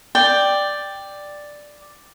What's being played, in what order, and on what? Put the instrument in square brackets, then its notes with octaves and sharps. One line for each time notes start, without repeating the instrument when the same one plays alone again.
[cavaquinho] D5 G5